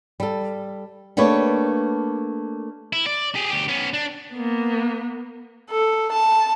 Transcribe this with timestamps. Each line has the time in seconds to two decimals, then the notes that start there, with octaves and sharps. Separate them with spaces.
0.20 G3 A4
1.17 A3 A#3 D4 G4 B4 C#5
2.93 E4
3.07 D5
3.35 G4 G#4
3.49 D2 G4
3.68 B3 C#4
3.94 D4
4.32 A#3 B3
5.71 A4
6.12 A5